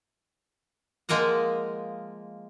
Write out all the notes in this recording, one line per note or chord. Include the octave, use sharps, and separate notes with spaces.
F3 G#3 A#3 A#4 D#5 F#5